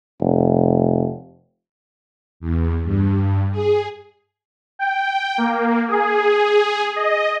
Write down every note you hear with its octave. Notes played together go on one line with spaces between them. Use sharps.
F1
E2
G2
G#4
G5
A#3
G#4
D#5